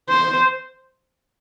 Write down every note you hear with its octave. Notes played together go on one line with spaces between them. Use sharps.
C5